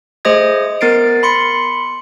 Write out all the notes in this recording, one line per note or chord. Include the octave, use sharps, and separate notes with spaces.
A3 G#4 C5 D#5 D#6 G#6
B3 A#4 A6 C7 D7
B5 C6 C#7